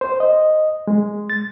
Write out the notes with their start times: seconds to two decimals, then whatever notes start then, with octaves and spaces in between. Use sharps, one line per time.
0.01 C5
0.20 D#5
0.87 G#3
1.30 A6